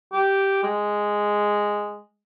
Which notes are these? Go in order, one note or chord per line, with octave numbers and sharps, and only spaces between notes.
G4
G#3